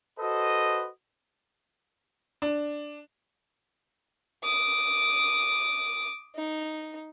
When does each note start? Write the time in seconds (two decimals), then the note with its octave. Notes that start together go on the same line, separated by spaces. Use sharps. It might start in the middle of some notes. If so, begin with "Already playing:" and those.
0.19 F#4 A4 B4 C5 D#5
2.42 D4
4.44 D6 D#6
6.36 D#4